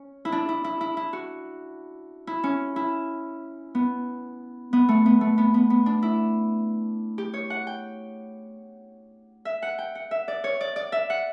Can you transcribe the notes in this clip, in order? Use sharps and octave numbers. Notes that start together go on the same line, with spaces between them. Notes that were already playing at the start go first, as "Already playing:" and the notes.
Already playing: C#4
E4
D4
E4
E4
E4
E4
F#4
E4
C#4
E4
B3
B3
A3
B3
A3
B3
B3
B3
D4
E4
G4
C#5
F#5
G5
E5
F#5
G5
F#5
E5
D5
C#5
D5
D5
E5
F#5